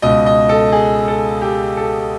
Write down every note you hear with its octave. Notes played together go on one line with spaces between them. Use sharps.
C#2 B2 D#5
D#5
A4
G#4
A4
G4
A4